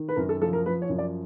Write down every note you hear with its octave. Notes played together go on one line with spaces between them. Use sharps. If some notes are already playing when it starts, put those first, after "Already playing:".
Already playing: D#3
B4
F#2 A#4
A4
F3 A4
A#4
F3 B4
C#5
F#2
D5